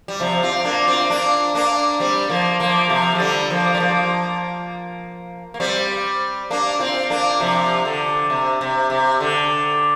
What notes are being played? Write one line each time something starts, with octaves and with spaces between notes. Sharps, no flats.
G3
C3 F3
C4 F4
A#3 D4
C4 F4
A#3 D4
A#3 D4
G3 C4
F3 A#3
F3 A#3
C3 F3
F3
D3 G3
F3 A#3
G3
F3 A#3
A#3
G3 C4
A#3 D4
C4 F4
A#3 D4
C3 F3
D3
C3
C3
C3
D3